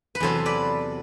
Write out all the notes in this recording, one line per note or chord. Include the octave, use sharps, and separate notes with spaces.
B4
E2 C3 F#3 A4 C5
B4 D5